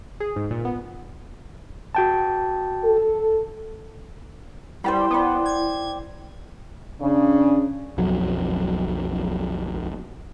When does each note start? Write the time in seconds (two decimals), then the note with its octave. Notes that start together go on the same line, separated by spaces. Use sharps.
0.20 G#4
0.36 G#2
0.51 A#2
0.65 B3
1.95 F#4 G5 A5
2.84 A4
4.84 G3 E4 C5 G5 B5
5.10 B3 C5 D5
5.46 G#6
7.01 C#3 D4
7.98 B1 F2 F#3